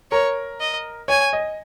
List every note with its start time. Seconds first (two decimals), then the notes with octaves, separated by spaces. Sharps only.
0.11 A#4 C#5
0.60 D#5
1.08 C#5 G#5
1.33 D#5